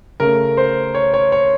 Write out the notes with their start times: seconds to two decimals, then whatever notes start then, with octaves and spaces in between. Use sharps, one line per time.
0.20 C#3 A3 A#4
0.57 C5
0.95 C#5
1.14 C#5
1.32 C#5